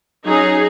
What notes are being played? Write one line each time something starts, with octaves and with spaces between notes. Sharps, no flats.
F#3 C#4 D#4 G#4